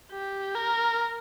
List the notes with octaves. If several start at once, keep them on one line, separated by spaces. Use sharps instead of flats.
G4
A#4